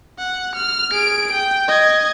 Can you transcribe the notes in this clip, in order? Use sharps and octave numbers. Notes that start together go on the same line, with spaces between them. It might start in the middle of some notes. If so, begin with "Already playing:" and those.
F#5
F6
G#4 D7
G5
D#5 G#6